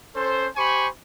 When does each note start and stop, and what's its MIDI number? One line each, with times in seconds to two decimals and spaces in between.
0.15 0.47 61
0.15 0.47 69
0.15 0.47 72
0.56 0.88 67
0.56 0.88 72
0.56 0.88 80
0.56 0.88 83
0.56 0.88 85